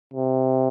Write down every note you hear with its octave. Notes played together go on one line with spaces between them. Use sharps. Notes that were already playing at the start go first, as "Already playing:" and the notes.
C3